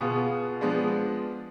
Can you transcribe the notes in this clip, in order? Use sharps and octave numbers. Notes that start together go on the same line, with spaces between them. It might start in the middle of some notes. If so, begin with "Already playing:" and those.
B2 B3 F4 G#4
F3 G#3 B3 D4